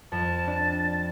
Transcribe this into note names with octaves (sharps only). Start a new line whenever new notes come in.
F2 A5 A6
D4